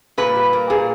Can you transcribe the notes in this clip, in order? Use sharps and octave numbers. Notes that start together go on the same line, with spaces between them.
A#2 B4
G3
A#3
A#2 G#4